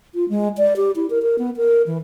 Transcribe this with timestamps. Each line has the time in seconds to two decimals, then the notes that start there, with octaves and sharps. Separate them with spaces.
0.15 F4
0.29 G#3
0.58 D5
0.76 G4
0.96 E4
1.10 A#4
1.22 A#4
1.39 B3
1.57 A#4
1.87 E3